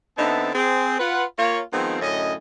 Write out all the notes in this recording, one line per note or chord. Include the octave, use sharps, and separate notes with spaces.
D3 B3 C4 D#4 E5 A5
C4 G#4
F4 B4 F#5
A#3 F4 C#5
D#3 F3 G#3 B3 C4
F#2 A2 D3 C#4 D#5